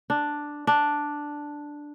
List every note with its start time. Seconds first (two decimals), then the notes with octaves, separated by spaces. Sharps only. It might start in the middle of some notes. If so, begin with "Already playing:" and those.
0.10 D4
0.67 D4